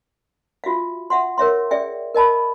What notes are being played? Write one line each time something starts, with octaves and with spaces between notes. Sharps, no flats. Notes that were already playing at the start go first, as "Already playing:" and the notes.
F4 F#4 E5 F5
E5 F#5 C6
A#4 C#5 E5 C6
G#4 D5 E5 G5
A#4 D#5 A5 B5